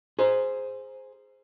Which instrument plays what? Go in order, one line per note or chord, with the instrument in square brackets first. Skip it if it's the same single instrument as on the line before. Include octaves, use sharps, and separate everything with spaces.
[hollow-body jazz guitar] G#4 C5